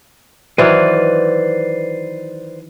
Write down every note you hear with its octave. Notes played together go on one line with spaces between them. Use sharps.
D#3 E3 F#3 B4 C5 D5